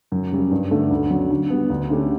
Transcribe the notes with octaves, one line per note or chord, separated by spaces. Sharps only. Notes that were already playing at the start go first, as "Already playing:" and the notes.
F#2
C#3 G3
G2
D3 A3
D2
C#3 F#3
D3
G3 B3
D2
D3 A3 C#4 G4